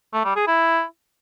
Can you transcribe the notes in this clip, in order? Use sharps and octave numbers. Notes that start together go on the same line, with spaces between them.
A3
G3
G#4
E4